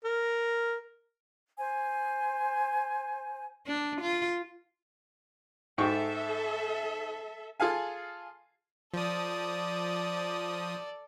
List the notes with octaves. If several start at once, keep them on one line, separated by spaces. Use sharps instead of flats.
A#4
C5 G#5
D4
F4
G#2 A4 E5 G5 C#6
F4 G#4 A4 F5 G#5
F3 A4 D5 D#6